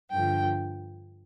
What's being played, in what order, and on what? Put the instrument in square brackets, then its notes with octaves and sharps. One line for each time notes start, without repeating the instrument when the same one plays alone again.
[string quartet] G2 D3 F3 G5